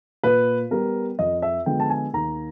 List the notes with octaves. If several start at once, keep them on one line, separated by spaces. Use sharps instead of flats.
A#2 B4
G3 B3 A#4
F2 D#5
E5
D3 F3 G#3 B3 G5
A5
G#5
D#2 A#5